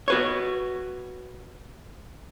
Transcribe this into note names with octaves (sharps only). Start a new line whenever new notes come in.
F#4 B4 C#5